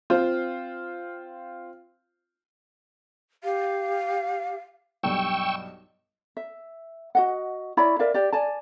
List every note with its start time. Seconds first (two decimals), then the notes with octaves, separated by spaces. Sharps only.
0.10 C4 F4 C5
3.44 G4 F5
5.03 B1 G2 G5 C#6 E6
6.37 E5
7.15 F#4 D#5 F#5
7.77 E4 C#5 D5 B5
7.99 A#4 D5 E5 F5
8.14 G4 D5
8.33 D5 G#5 A5